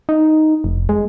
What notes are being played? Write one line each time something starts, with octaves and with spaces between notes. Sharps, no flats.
D#4
F1
G#3